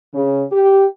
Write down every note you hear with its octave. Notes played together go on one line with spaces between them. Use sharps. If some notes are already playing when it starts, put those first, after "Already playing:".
C#3
G4